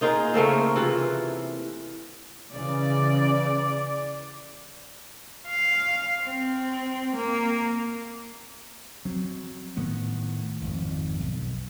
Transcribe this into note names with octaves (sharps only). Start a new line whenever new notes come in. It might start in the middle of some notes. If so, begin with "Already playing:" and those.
A#3 D#4 F4 G#4
C#3 A3 A#3 C4
C#5
C3 E3 F4
C#3 E3 D5
F5
C4
A#3
F#3 C4
A2 D#3 B3
G#1 F2
B1